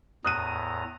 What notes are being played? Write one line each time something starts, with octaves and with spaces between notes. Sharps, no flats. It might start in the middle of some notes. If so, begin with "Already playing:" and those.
E2 A2 A#5 D#6 F#6 D#7